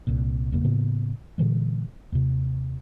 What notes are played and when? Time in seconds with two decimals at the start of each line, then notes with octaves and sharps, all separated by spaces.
0.07 C2 A#2
0.52 G1 E2 C#3 A#3
0.65 A2 C#3 A#3 B3
1.38 A#2 D3 E3 G#3
2.12 D#2 C3